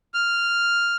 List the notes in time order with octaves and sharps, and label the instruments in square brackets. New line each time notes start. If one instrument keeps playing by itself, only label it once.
[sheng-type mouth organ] F6